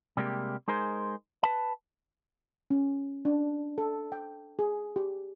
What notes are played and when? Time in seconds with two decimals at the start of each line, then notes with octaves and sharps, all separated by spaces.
0.17 C3 G3 G#3 A#3 B3 G4
0.68 G#3 D#4 G#4 A#4 C5
1.43 B4 A5
2.70 C#4
3.25 D4
3.78 A4
4.12 G5
4.59 G#4
4.96 G4